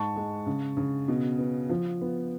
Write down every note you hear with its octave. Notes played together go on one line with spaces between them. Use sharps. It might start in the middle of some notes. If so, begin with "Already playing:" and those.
Already playing: G#2 A5 C#6
G#3
C#3
C#3
B2
B3
F3
B3